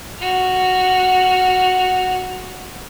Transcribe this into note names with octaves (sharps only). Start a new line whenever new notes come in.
F#4 F6